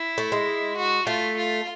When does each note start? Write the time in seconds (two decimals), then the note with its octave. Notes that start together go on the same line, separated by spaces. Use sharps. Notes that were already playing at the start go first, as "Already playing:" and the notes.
Already playing: E4
0.18 A3
0.32 G#3
0.77 F#4
1.07 A3 F4
1.37 F4